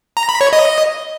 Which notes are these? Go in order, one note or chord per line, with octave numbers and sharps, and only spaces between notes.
A#5
B5
C#5
D#5